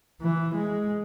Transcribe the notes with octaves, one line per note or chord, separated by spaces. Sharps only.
E3
G#3